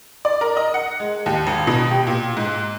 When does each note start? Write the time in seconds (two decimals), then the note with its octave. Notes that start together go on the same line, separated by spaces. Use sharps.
0.25 D5
0.41 A#4
0.57 D#5
0.74 F#5
1.00 G#3
1.26 D#2
1.47 G#1
1.67 B2
1.91 G4
2.07 A#2
2.37 G#2